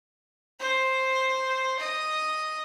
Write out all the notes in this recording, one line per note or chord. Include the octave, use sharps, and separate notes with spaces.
C5
D#5